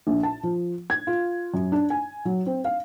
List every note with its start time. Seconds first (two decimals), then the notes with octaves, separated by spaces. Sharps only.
0.07 A#1
0.23 A5
0.43 F3
0.90 G#6
1.07 F4
1.54 F#2
1.72 D4
1.90 G#5
2.25 F#3
2.46 C4
2.65 F5